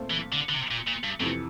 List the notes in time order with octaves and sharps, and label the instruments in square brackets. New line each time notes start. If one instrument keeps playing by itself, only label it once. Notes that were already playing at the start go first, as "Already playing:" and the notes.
Already playing: [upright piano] A#2 A3 C4 F4 C5
[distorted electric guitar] E3
D3
D3
C3
A#2
A#2
G2
[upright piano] F2 C3 E3 [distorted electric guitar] A2